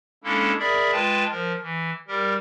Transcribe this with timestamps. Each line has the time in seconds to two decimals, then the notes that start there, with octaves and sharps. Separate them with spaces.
0.24 G#3 A#3 C#4 D4 E4 A4
0.59 G#4 A#4 D5 E5 B5
0.92 G#3 F4 B4 G5 A5 A6
1.31 F3 A#4
1.62 E3
2.08 G3 G4 A#4